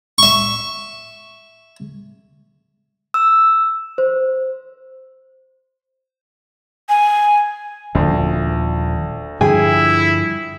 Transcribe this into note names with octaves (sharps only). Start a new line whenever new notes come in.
E5 C#6
E6
C5
G#5
D#1 D2 F3
G2 D3 F3 E4 G#4 G5 G#5